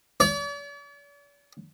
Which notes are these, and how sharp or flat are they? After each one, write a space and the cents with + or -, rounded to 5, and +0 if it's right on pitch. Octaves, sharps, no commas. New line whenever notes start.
D5 -45